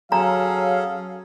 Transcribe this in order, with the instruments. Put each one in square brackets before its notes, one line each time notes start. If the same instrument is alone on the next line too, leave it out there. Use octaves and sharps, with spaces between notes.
[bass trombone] F#3 [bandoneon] C#4 G#4 A4 [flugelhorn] F5 [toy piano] A#5